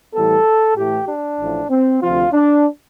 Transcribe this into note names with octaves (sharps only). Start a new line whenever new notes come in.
A2 E3 G3 B3 A4
A2 E3 A3 G4
D4
A1 A2 F3
C4
D2 C3 F3 C4 F4
D4